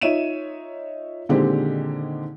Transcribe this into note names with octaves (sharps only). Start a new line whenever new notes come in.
D#4 F4 C#5 E5 D#7 E7
A#2 D3 D#3 G#3 C4 G4